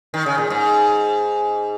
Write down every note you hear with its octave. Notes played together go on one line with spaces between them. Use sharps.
D#3
C#3
A#2
G#2